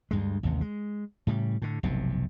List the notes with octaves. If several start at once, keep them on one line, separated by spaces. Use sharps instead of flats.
D2 G2 G#3
A1 D#2 C3
G#3
A2 C#3 G3
A2 D3
F1 B1 G2 C3